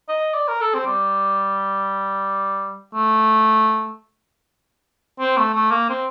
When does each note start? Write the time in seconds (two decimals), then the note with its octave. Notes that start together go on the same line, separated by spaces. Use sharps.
0.08 D#5
0.34 D5
0.48 A#4
0.61 A4
0.74 C4
0.86 G3
2.95 A3
5.20 C4
5.37 A3
5.54 A3
5.71 A#3
5.90 C4